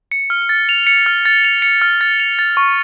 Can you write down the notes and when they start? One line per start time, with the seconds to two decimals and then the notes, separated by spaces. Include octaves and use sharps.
0.12 C#7
0.30 F6
0.49 A6
0.69 F7
0.87 C#7
1.06 F6
1.25 A6
1.45 F7
1.62 C#7
1.82 F6
2.01 A6
2.20 F7
2.39 A6
2.57 C#6